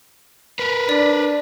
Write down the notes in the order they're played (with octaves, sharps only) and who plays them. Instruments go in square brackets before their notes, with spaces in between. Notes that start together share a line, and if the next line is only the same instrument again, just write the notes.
[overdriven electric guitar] A#4 B4
[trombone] D4 [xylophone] D5